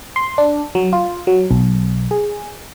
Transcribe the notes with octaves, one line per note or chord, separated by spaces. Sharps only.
C6
D4
F#3
F4
F#3
B1
G#4